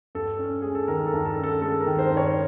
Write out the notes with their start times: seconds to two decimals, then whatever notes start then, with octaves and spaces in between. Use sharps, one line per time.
0.15 G2 A4
0.39 C#4
0.62 G#3 G#4
0.75 A4
0.88 D#3 A#4
1.07 A4
1.13 G2
1.26 A4
1.37 C#4
1.44 A4
1.61 G#3 A4
1.80 A#4
1.87 D#3
1.99 C5
2.11 G2
2.17 C#5